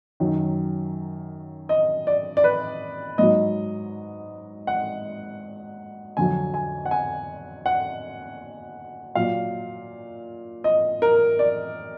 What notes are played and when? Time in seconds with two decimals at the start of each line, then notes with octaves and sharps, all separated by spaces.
0.20 F#2 D#3 F#3
1.69 D#5
2.07 D5
2.37 D5
2.44 B4
3.18 G#2 F#3 D#5
4.67 F#5
6.17 F2 D3 F#3 G#5
6.54 G#5
6.86 F#5
6.91 G#5
7.66 F#5
9.15 A#2 F#3 F5
10.64 D#5
11.02 A#4
11.39 D5